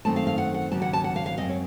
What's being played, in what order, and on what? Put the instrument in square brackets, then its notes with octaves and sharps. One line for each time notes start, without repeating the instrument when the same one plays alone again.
[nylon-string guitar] F#2 D#3 A3 C4 A5
F5
F5
F#5
F#5
D#2 C#3 F#3 A5
F#5
A5
F#5
F5
F5
F#2 F3 C4 D#5
C#5